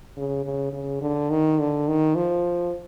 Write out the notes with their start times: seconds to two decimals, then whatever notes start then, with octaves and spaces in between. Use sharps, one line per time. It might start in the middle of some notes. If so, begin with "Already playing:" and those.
0.17 C#3
0.45 C#3
0.73 C#3
1.01 D3
1.30 D#3
1.59 D3
1.88 D#3
2.15 F3